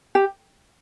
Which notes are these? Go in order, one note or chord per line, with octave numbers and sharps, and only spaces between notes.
G4